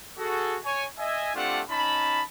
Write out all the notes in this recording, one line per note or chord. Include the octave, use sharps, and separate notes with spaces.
F#4 G#4 A4
C#5 G#5
D#5 E5 G#5
A3 C4 D4 F4 G4 F#5
C#4 D#4 A5 B5